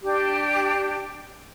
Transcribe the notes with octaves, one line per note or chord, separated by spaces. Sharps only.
D4 G4